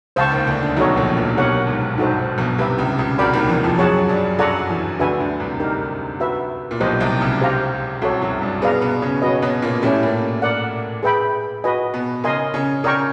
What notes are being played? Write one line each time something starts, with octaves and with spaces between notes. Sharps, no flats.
C#2 C#3 C5 F5 A5 C#6
D#2 D#3
D2 D3
D2 D3
B1 B2 D#4 F#4 A4 C#5
A#1 A#2
A#1 A#2
C3
B1 B2 G4 A#4 C#5 F#5
G#1 G#2
G2 D#4 F#4 A4 C5
G2
B1 B2
C2 C3 G4 B4 E5
C#2 C#3
C#2 C#3
C2 C3 F#4 A#4 D5 G5 B5
D#2 D#3
E2 E3
F2 F3
F#2 F#3 G#4 C#5 F#5 A5
G2 G3
F#2 F#3 A4 D5 F#5 A#5 C#6
E2 E3
D2 D3 D4 F#4 B4 E5 G#5
D2 D3
C2 C3
D#4 G4 A#4
F#4 B4 E5
A#2
B1 B2 G4 C5 D#5
C2 C3
C#2 C#3
G4 C5 F5 A#5
C2 C3 F#4 A4 C#5
F#2 F#3
G2 G3
B2 B3 G#4 B4 D5 F5 A#5
B2 B3
C#3 C#4
C#4 F#4 B4 D#5
B2 B3
A#2 A#3
A2 A3 C#4 E4 G4
A#2 A#3
A#4 D5 F#5
G#4 B4 E5 G5 B5
F#4 B4 D#5 G#5
B2 B3
C#3 C#4 A#4 D#5 G#5 C6
C#3 C#4
C#3 C#4 A#4 D5 G5 A#5 C#6